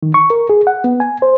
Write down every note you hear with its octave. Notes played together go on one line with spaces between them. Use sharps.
D#3
C#6
A#4
G#4
F#5
B3
G#5
C5